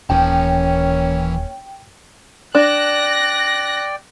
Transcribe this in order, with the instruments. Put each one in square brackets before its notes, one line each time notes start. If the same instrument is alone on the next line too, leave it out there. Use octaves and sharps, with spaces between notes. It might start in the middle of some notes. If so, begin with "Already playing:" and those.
[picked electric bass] D#1 [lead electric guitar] E3 A5 [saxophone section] A#3 C#4 [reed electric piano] G5
[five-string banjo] D4 [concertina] D5 G5 [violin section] F#6 A#6